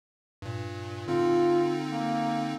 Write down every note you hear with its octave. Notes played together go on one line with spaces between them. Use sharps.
G2 A#2
D3 C4 D#4 F4
A#3